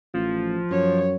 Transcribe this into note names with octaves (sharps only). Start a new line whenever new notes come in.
A1 F3
F#2 C#5